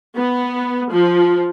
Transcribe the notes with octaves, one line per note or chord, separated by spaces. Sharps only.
B3
F3